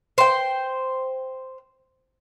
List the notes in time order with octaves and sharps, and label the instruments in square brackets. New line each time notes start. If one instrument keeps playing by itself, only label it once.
[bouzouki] C5 G5